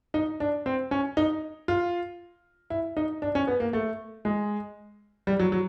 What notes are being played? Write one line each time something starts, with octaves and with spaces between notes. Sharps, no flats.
D#4
D4
C4
C#4
D#4
F4
E4
D#4
D4
C#4
B3
A#3
A3
G#3
G3
F#3
F#3